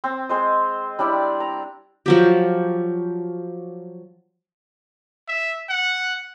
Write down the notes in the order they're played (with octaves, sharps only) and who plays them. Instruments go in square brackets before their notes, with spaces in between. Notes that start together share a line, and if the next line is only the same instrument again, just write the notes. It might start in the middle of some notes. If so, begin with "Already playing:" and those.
[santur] C4
G#3 C5 D#5
G3 D4 E4 D5
A#5
[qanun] F3 F#3 G4
[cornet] E5
F#5